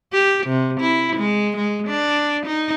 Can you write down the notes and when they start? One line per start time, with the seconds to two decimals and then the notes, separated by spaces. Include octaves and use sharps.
0.13 G4
0.47 C3
0.80 E4
1.16 G#3
1.57 G#3
1.88 D4
2.46 D#4